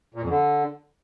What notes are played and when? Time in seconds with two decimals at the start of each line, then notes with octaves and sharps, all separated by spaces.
0.14 A#2
0.22 F2
0.29 D3